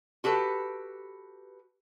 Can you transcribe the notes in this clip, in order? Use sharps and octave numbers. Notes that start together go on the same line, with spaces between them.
F#4 G4 A4 B4